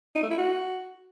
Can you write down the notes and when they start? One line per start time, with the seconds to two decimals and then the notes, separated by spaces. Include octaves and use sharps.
0.16 D#4
0.23 A3
0.31 E4
0.38 F#4